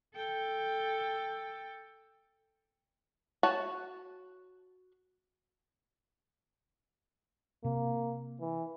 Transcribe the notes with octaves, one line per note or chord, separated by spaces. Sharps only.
A4 G5
F#4 C#5 G#5 A5
C3 A#3
E3